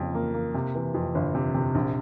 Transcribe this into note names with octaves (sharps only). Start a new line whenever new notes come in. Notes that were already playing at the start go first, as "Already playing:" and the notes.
Already playing: F2 C#3 F3 A#3
A#3
A#3
C3
E3
F2
G1
C3
C3
A#1